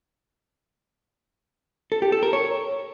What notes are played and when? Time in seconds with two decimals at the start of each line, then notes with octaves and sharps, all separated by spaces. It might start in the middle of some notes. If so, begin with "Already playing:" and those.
1.92 A4
2.02 G4
2.12 A4
2.23 A#4
2.33 C#5